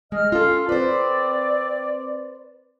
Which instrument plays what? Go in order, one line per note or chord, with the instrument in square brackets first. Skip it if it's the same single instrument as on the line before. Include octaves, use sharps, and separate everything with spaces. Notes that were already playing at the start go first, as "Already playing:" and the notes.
[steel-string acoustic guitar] G#3 [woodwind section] D#5 F6
[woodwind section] C#4 F5 [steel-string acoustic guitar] F4 A4
[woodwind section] C4 D5 [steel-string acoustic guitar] B4 C5